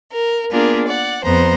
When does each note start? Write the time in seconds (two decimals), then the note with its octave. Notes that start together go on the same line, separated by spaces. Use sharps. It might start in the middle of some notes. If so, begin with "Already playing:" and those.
0.11 A#4
0.51 A#3 B3 D4 F4 G#4 A#4
0.87 D5 F#5
1.24 F2 B3 C5 A#5